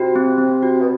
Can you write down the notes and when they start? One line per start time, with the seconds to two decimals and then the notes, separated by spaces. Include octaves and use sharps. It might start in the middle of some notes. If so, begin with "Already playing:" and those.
Already playing: C3 F#4
0.16 C4
0.38 C4
0.63 F#4
0.81 B2